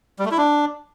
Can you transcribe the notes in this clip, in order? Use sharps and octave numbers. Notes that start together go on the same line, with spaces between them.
G3
A3
E4
D4